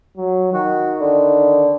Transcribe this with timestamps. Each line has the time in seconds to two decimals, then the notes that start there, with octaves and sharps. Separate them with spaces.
0.17 F#3
0.53 D#3 F#4
1.00 D3